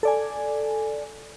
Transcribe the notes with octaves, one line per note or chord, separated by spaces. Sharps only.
A4 D5 G#5